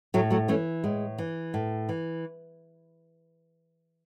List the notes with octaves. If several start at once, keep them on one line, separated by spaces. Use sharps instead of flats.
A2 F#3 A3
F#3 A3
E3 A3 C#4
A2 G#3
E3
A2
E3